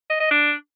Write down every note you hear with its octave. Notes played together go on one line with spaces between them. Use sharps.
D#5
D#5
D4